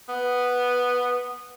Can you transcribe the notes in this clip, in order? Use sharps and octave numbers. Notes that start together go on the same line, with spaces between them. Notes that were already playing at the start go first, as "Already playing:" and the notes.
B3